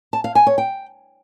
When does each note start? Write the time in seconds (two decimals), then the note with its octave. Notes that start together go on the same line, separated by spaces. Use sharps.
0.13 A5
0.24 F5
0.35 G#5
0.47 C#5
0.58 G5